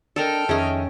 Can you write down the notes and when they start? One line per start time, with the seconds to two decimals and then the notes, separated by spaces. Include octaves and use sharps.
0.16 D4 A4 A#4 D#5 G5 F6
0.49 F2 D#3 C#4 G#4 D#5 E5